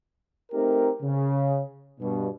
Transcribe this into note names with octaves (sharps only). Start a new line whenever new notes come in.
A3 C4 D#4 G4 A#4
C#3
G2 B2